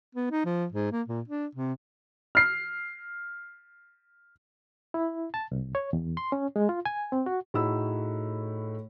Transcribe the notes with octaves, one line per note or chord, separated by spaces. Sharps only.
B3
D#4
F3
G#2
A#3
A#2
D4
C3
F6 C7
E4
A5
C2
C#5
E2
C6
C#4
G#3
F4
G#5
C4
F#4
A2 D#4 F#4 G#4 B5 E6